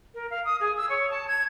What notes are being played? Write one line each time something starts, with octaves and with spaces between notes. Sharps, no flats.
A#4
F5
D#6
G#4
E6
C#5
A5
G#6